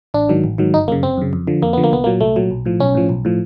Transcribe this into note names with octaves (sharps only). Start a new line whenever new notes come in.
A1 D4
G#2 D#3 F#3
A1
G#2 D#3 F#3
G1 D#4
F#2 C#3 A#3
G1 C4
F#2 C#3
F2
D3 F3
F2 A#3
D3 F3 B3
A#3
C2 B3
A#2 F#3 A#3
C2 A3
A#2 F#3
B1
A2 F3
B1 C#4
A2 F3
B1
A2 F3